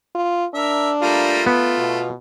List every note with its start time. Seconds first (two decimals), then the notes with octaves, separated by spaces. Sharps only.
0.15 F4
0.54 D4 A#4 E5
1.02 G3 A3 A#3 F4
1.46 A3 B3
1.78 B2